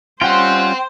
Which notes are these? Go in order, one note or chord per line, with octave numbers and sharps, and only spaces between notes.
G3 C#4 F4 C5 F#5 G5 C6